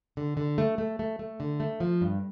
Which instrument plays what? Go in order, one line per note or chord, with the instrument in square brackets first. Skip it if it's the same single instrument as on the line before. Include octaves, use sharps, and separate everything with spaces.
[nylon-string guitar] D3
D3
A3
A3
A3
A3
D3
A3
F3
G2